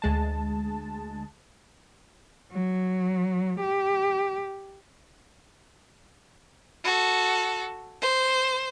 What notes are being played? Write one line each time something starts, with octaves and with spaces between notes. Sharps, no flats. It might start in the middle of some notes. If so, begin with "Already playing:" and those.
D2 G#3 A5
F#3
G4
F#4 A4
C5